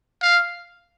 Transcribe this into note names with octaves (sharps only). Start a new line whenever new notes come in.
F5